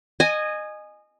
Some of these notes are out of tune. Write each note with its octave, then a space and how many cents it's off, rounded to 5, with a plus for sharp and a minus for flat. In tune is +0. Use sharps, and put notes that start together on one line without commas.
D#5 -20 G#5 +0